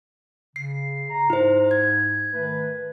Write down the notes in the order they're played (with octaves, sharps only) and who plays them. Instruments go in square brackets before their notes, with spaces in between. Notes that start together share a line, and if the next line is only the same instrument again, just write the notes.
[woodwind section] C#3 [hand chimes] C7
[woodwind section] A#5
[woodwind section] G#2 [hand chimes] E4 C5
[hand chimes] G#6
[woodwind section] D#3 A3 B4